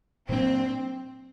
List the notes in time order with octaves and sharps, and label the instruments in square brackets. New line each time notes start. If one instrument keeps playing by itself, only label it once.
[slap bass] A#2 F#3 A#3 D4 [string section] C4